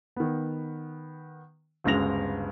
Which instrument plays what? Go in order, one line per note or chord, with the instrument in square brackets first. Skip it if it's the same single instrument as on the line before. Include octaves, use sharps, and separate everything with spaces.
[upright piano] D#3 B3
G1 D2 C#3 G#3 A#6 F7